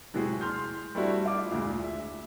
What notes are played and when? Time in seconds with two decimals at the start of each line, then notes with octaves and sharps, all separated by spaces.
0.14 A2 C3 F#3 G#3 F#4 G#4
0.41 C6 F6 G6
0.95 G3 A3 C4 D4 E4 F#4
1.26 F4 D6
1.52 D2 A#2 G#3
1.84 E5